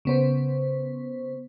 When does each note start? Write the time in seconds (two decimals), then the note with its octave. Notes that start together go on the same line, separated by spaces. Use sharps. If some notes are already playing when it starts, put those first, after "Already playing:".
0.05 C#3 B3 C5